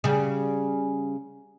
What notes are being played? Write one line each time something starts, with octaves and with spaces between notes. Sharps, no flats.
C#3 G3